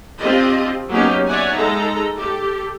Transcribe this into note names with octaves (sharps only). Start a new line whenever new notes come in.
C4 D4 F4 G4 D#5
F#3 A#3 B3 C#4 D#4 G4
C#5 D5 E5 F#5 G#5
G#3 D#4 A4 A#5
G4 A4